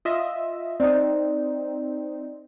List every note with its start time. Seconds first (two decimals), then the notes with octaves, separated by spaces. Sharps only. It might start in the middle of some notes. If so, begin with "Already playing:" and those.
0.05 F4 D#5 E5
0.80 C4 D#4 D5